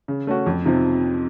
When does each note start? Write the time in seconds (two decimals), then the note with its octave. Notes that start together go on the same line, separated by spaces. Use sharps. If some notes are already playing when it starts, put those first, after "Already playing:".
0.08 C#3
0.27 A3 C#4 F#4
0.46 F2
0.65 C3 F3 C4 D#4